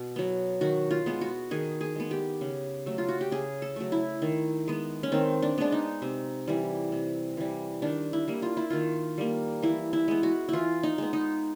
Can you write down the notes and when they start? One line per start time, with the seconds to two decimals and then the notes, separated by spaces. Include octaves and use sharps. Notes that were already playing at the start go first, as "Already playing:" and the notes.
Already playing: B2
0.16 F#3 B3
0.61 D#3 F#4
0.91 F4
1.06 G#3 B3
1.21 F#4
1.51 D#3 G#4
1.81 G#4
1.96 G#3 B3
2.11 G4
2.41 C#3
2.86 F#3 A3
2.98 F4
3.09 F#4
3.21 G4
3.31 C#3 G#4
3.62 A4
3.76 F#3 A3
3.92 E4
4.22 D#3
4.68 G#3 B3
5.03 C#4
5.12 D#3 C4
5.43 D4
5.58 G#3 B3 D4
5.72 D#4
6.02 C3
6.47 E3 G3
6.92 C3
7.37 E3 G3
7.82 D#3 D4
8.13 E4
8.28 G3 A#3
8.42 F4
8.57 E4
8.70 D#3 F4
9.18 G3 A#3
9.62 E3 E4
9.93 E4
10.08 G#3 B3
10.23 F#4
10.49 E3 E4 F4
10.83 D#4
10.98 G#3 B3
11.13 D#4